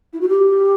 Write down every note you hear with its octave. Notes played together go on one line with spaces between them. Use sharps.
E4
F#4
G4